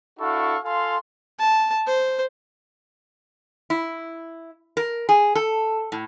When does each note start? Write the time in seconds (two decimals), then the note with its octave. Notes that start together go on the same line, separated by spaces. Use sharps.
0.19 D4 E4 F#4 A4 F5 C#6
0.64 F4 A4 F5 G#5 C6
1.40 A5
1.87 C5
3.70 E4
4.77 A#4
5.09 G#4
5.35 A4
5.92 A2